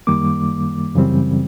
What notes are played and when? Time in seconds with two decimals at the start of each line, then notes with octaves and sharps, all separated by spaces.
0.07 F#2 D#3 G3 A#3 D6
0.95 F#2 C#3 E3 G3 C4